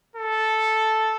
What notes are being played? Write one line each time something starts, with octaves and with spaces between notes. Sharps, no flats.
A4